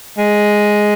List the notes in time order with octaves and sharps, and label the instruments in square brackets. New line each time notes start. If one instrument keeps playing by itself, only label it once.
[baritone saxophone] G#3